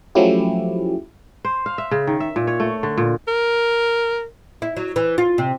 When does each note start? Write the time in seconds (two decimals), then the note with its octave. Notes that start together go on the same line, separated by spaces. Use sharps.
0.15 F3 F#3 A3 C#4 E4 G4
1.45 C5
1.66 F5
1.78 E5
1.91 C#3
2.07 D#3
2.20 E5
2.36 A#2
2.47 C#5
2.60 A3
2.83 D3
2.97 A#2
3.28 A#4
4.62 E4
4.77 F#3
4.96 E3
5.18 F4
5.38 C3